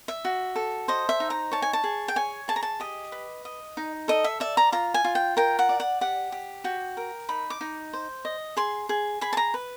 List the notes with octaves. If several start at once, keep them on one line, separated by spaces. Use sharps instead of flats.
E5
F#4
A4
C5 D#5
E5
D#4
A#5
C#5 A5
G#5
A5
G#4
G5
C#5 G#5
G#4 A5
A#5
A5
G4 D#5
B4
D#5
D#4
A4 D#5
E5
D5 E5
A#5
F4 A#5
G#5
F4
G5
A#4 G5
F#5
D5
F#5
G4 F#5
G4
F#4 G5
A#4
D#4 B5
D6
D#4
C5
D#5
G#4 C6
G#4
G#4 B5
A5
A#5
B4